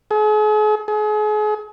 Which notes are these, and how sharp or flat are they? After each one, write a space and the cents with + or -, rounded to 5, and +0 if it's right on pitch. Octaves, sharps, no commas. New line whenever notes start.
G#4 +40
G#4 +35